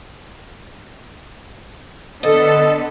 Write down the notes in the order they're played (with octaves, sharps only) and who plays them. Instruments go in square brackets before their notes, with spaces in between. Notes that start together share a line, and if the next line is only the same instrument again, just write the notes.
[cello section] D3 B3 [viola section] A4 [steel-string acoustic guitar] D#5